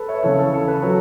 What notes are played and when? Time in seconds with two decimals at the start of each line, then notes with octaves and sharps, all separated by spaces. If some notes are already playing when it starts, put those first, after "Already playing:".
Already playing: A4 B4
0.08 C#5 E5
0.23 C#3 E3 A4 C#5
0.39 A4
0.54 A4
0.68 B4
0.82 F#3 A4 C#5